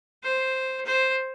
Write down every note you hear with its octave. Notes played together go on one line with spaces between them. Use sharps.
C5
C5